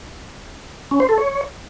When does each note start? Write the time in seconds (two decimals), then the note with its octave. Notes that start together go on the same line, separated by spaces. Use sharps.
0.91 C#4
1.00 C5
1.09 A4
1.18 C#5